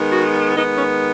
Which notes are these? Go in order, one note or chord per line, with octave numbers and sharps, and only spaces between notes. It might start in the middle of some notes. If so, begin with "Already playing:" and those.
Already playing: D#3 G#3 B3
F#4
D#3 G#3 B3 D#4
C#4